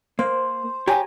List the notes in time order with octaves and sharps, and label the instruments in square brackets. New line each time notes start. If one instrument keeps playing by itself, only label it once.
[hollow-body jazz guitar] A#3 [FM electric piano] C5 [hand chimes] C6
[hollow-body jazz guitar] G4 C#5 [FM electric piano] G#5 A#5